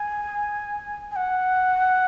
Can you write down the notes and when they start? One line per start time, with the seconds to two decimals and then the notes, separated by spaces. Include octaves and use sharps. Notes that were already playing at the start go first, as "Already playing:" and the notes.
Already playing: G#5
1.11 G#5
1.16 F#5